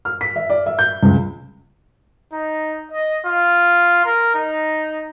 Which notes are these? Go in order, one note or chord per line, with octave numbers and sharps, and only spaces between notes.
F6
B6
E5
D5
E5
G6
C#2
D#4
D#5
F4
A#4
D#4